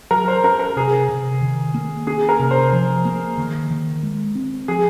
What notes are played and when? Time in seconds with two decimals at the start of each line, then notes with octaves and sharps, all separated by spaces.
0.11 F#3 A#4
0.28 C5
0.44 C#4 A#4
0.60 A#4
0.76 C3 G#4
1.09 C3
1.42 D#3
1.74 A#3
2.07 C#4 G#4
2.29 A#4
2.39 C3
2.51 C5
2.72 F3
3.05 A#3
3.38 D#3
3.71 D#3
4.03 G#3
4.35 C4
4.68 F3 G#4